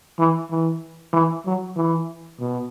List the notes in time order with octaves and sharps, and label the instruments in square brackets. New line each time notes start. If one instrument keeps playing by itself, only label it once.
[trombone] E3
E3
E3
F#3
E3
B2